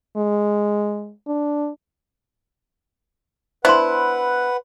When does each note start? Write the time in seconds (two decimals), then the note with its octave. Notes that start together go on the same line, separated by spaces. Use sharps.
0.17 G#3
1.27 D4
3.65 B3 D4 E4 B4 C5 F#5 C6